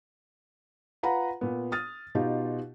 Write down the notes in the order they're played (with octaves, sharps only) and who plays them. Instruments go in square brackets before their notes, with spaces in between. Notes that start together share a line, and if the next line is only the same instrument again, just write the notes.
[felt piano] F4 B4 F#5 A#5 B5
A#2 B3
D#6 F6 A6
B2 D#4 F4 G4